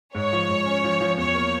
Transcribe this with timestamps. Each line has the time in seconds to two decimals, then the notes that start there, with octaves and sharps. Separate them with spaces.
0.15 G#2 C#5
0.33 F3
0.49 G#2
0.66 C#4
0.84 F3
1.01 F3
1.18 E2 C#5
1.35 A#3